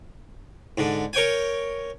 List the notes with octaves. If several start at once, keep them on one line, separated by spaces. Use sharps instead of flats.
G#2 D3
A#4 C#5 G5 G#5